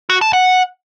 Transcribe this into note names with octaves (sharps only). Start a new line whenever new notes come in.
F#4
A5
F#5